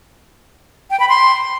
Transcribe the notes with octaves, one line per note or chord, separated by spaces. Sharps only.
G5
B5
C6